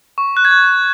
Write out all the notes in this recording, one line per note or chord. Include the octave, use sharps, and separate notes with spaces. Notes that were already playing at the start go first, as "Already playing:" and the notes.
C#6
F#6
G#6
F#6